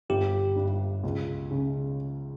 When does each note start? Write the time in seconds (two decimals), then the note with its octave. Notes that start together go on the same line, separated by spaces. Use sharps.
0.09 G1 G4
0.56 G2
1.03 C#2
1.51 C#3